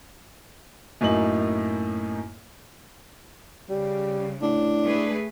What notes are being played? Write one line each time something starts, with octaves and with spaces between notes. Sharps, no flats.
F#2 A2 A#3 D#4 F#7
C#3 G3
A2 D4
A3 G#4 B4